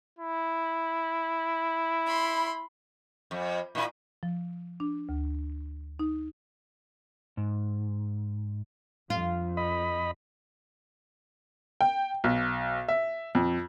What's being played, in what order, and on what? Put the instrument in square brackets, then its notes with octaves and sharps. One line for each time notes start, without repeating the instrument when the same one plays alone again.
[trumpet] E4
[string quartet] B5 C6
[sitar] F2
A#2 E4
[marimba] F3
D4
D2
D#4
[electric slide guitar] G#2
[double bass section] F2 [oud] F4
[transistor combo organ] D#5 B5
[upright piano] G5
B1
E5
F2